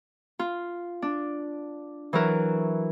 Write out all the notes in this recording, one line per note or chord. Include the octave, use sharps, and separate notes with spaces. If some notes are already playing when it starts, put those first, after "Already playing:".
F4
D4
E3 F#3 E4 A#4